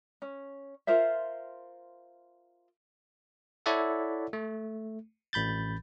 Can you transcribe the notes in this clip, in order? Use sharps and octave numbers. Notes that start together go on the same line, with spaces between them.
C#4
F4 A#4 C5 E5
E4 A4 C#5 D5 E5 F#5
A3
A1 B5 G6 A6